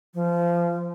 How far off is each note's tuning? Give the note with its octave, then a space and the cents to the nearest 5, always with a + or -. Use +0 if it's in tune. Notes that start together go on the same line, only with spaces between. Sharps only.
F3 -25